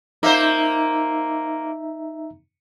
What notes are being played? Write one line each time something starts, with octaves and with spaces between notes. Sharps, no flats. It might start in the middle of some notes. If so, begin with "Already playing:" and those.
A#3 D#4 C5 E5 A#5